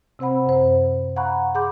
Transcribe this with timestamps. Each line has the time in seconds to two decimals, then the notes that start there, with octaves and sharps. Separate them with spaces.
0.19 C3 C4 C5 F#5 B5
0.46 F#2 C5
1.16 F5 F#5 A#5 B5 C#6 F#6
1.55 G#4 F#5 B5 C6 D6 G6